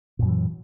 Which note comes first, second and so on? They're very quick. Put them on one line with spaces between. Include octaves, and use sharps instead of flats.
A#2 F#2 F#3 E3